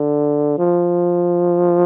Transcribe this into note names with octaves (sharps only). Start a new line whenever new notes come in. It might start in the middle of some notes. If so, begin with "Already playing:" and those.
Already playing: D3
F3